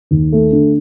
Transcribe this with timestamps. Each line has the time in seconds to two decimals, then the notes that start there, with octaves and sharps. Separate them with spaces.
0.11 D#2
0.32 A3
0.52 D3